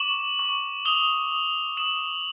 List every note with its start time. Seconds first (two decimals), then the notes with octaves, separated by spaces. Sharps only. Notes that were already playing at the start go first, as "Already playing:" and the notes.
Already playing: C#6 D6 E7 F#7
0.39 C#6
0.85 D#6 F7 G7
1.32 D#6
1.77 D#6 E7 F#7